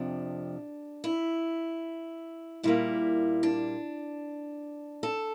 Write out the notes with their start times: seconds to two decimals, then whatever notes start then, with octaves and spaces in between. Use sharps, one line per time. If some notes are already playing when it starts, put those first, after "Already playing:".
Already playing: F2 C3 F3 D4
1.04 E4
2.63 A#2 G3 A#3 E4
3.43 D4
5.03 A4